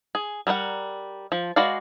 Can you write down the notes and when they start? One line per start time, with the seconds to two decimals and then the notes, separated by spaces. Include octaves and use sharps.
0.15 G#4
0.47 G3 A#4 C5 F#5
1.32 F3
1.56 G#3 F#4 B4 D5 F5